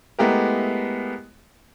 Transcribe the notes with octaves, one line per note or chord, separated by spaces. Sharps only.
G#3 A3 B3 E4 G4 A#4